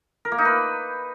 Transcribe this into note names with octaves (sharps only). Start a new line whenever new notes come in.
A#4
A#3
D#4
B4